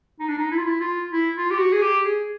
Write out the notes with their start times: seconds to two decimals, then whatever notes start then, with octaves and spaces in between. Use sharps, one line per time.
0.20 D#4
0.28 D4
0.38 D#4
0.51 E4
0.58 F4
0.65 E4
0.81 F4
1.12 E4
1.36 F4
1.51 G4
1.58 F#4
1.73 G#4
1.82 G4
2.05 G#4